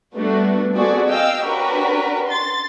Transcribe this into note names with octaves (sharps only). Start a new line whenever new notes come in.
G3 A3 B3 D4 F#4
B3 C4 F#4 G#4 A4 D5
D#5 F5 G5 E6
C#4 D4 F#4 G4 A#4 B4
C6 A6